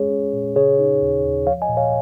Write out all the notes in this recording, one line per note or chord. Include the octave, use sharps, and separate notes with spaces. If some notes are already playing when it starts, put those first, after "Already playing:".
Already playing: G#3 C#4 G#4 C#5
C#4
A#2
C#3 G#4 C#5
D#4
D#2
D#2
F3 C#5 F5
D#5 G#5
A#2
C#5 F5